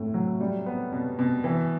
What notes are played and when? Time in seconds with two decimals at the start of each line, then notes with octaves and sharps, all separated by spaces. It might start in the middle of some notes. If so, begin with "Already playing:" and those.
Already playing: A2 A3
0.14 F#3
0.40 G3
0.66 B3
0.92 B2
1.19 B2
1.44 E3